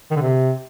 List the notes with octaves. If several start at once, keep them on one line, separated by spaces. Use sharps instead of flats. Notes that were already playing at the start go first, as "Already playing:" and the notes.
D#3
D3
C3